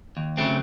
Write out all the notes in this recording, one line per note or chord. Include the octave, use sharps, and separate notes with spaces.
D#2
C#3 F#3 A3 C4